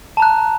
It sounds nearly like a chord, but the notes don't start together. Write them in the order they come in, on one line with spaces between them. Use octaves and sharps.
A5 A#5 F#6